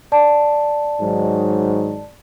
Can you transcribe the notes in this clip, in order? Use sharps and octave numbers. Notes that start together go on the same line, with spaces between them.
D5 A5
G#2 D#3 F#3